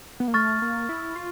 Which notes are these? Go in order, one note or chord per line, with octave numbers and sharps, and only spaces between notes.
B3
A#3
A3 C#6 F6 A6
A#3
E4
F4